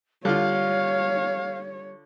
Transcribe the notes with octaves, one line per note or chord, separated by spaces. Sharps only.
D3 G3 F4 C#5 F5